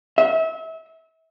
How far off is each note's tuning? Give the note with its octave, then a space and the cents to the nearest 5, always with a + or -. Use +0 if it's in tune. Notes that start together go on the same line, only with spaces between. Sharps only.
E5 -30